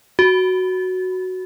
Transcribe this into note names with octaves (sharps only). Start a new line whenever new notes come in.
F#4